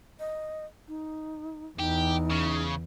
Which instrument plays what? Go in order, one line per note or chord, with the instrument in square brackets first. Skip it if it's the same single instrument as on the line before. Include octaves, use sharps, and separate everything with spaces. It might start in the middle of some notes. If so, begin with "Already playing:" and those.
[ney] D#5
D#4
[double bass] E2 [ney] D#4 [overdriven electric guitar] G4
[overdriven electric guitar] C#3